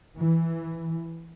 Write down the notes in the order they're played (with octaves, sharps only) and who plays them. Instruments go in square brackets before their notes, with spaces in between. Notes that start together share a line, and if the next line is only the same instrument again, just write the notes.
[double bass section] E3